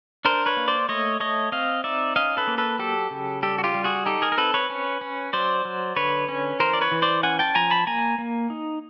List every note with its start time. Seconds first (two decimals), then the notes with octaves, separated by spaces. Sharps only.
0.25 D4 A#4 C5
0.46 B4 C#5
0.57 A#3
0.68 C5 D5
0.89 A3 C#5 D#5
1.20 A3 C#5 D#5
1.52 C4 D#5 F5
1.84 D#4 D5 E5
2.16 C#4 D#5 F5
2.37 A4 B4
2.47 A#3
2.58 A4 B4
2.79 F#3 G4 A4
3.11 C#3
3.43 G3 G4 A4
3.58 F#4
3.64 F4 G4
3.74 G3
3.84 F#4 G#4
4.06 D#4 G4 A4
4.22 G#4 A#4
4.32 A#4
4.37 C4 A4 B4
4.54 B4 C#5
4.70 C#4
5.01 C#4
5.33 F#3 C5 D5
5.65 F#3
5.96 D3 B4 C#5
6.29 C#4
6.59 E3 A#4 C5
6.73 D5
6.81 B4 C#5
6.91 E3
7.02 C5 D5
7.23 C#4 F#5 G#5
7.39 G5 A5
7.55 F3 G#5 A#5
7.70 A5 B5
7.87 A#3 G#5 A#5
8.18 A#3
8.50 D#4